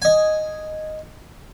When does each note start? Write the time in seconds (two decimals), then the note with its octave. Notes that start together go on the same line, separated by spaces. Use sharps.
0.02 D#5 G#5